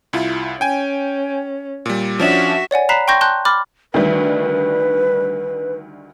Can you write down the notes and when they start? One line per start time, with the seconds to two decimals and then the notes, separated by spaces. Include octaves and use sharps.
0.13 C2 E4 F4
0.61 C#4 G5 G#5
1.86 A#2 G3
2.20 F3 C#4 D4 F#4 E5
2.71 C#5 D5 F#5 G#5
2.89 A#5 B5 F#6 B6 C7 E7
3.08 G5 C6 C#6 G6 A#6
3.21 A5 C6 F#6 G6
3.45 B5 D6 F6 A6
3.94 D2 D#3 G3 B4